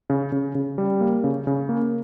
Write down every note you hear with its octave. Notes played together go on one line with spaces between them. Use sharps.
C#3
C#3
C#3
G3
A#3
C#3
C#3
A#3